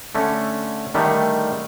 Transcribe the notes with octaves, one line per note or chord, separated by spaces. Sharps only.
D3 A3 C#4
D3 D#3 G3 A3